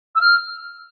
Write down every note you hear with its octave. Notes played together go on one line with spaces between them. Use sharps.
E6
F6